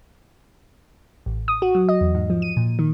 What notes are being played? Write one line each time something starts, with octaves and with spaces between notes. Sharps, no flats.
A1
D#6
F#4
F#3
D#5
E2
G#2
F3
D#7
A#2
D#3